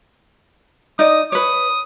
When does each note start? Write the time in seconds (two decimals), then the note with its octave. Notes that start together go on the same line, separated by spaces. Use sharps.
0.99 D#4 D5 D#5 D#6
1.32 B4 C#5 D#6